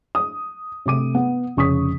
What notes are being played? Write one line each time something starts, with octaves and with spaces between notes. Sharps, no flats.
D#6
C3 A3 D6 D#7
B3
F1 C#3 C#6 D#6 B6